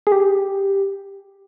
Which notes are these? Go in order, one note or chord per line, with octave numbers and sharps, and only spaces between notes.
G#4
G4